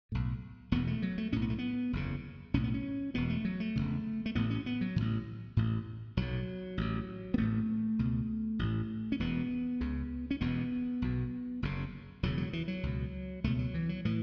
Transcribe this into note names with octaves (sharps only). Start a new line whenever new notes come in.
B1 A2
E1 E2 B2 B3
A3
F#3
A3
B1 A2 C#4
B3
A3
B3
F#1 E2 C#3
B1 A2 C#4
B3
C#4
E1 E2 B2 B3
A3
F#3
A3
E1 E2 C#3
A3
A1 A2 B3
C#4
B3
F#3
A1 A2 E3
A1 A2
B1 B2 F#3
A1 A2
B3
A1 A2 A3
C#2 B2
A1 A2
C#4
E1 E2 B2 B3
C#2 C#3
C#4
E1 E2 B2 B3
B1 B2
F#1 F#2 C#3
E1 E2 C#3 F#3
F#3
E3
F#3
C#2 B2
C#2 B2 A3
F#3
E3
F#3
A2 E3